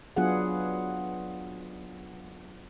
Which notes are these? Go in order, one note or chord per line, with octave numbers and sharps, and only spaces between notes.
F#3 B3 D4 F4 G#4 F#5